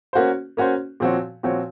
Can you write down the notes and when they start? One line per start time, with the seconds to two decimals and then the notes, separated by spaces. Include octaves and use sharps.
0.13 A#3 C#4 F#4 C5
0.57 A#3 C#4 F#4 C5
1.00 A#2 F3 C4 F#4 C#5
1.43 A#2 F3 C4 F#4 C#5